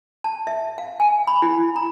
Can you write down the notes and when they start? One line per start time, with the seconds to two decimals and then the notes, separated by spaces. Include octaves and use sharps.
0.24 A5
0.47 E5
0.78 F5
1.00 G#5
1.27 B5
1.42 E4
1.76 A#5